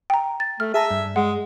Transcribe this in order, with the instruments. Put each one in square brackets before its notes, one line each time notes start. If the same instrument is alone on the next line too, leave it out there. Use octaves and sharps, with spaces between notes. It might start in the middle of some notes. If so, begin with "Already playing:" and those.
[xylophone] G5 A#5
A6
[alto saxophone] A3 [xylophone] F6
[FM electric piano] G#4 A5 A#5 [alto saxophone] E5
[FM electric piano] G2
[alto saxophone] G#3 [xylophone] F#5